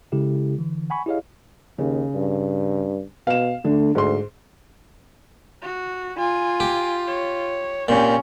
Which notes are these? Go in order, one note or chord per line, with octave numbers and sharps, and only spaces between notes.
C#3 G#3 E4 G4 A4
D3 E3
F#5 G#5 B5 C#6
E4 G4 G#4 C#5 D#5 F5
D#2 C#3
G2
B2 F5 E7
D3 A3
D2 G#2 C6
F#4
F4 G#5
G4
C#5
A#2 C4 C#4 G4